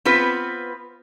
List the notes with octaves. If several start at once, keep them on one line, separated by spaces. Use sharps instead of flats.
B3 C4 F4 B4